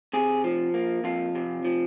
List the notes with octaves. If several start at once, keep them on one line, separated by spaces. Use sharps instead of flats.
C3 G#4
F3
A#3
F2 F4
C3
F3